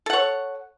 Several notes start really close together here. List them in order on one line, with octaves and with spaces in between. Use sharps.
A4 F#5 C#5